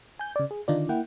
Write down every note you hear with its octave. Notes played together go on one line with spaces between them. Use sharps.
G#5 G6
C#3 D5
G#4
D3 D#3 D4 D#4 F4 D5
A#3 E4 F#5 G5